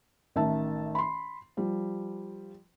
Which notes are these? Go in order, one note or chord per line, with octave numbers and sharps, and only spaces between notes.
A1 D#3 E5 A5
B5 C6
F3 G3